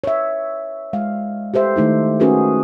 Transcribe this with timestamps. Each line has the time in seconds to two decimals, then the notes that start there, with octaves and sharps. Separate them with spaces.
0.04 C#5 E5
0.93 G#3 F5
1.54 G4 A4 C5 E5
1.76 D#3 A3 D#4 E4
2.20 C#4 F#4 G#4 A#4 B4